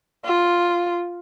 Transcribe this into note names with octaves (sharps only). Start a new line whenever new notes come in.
F4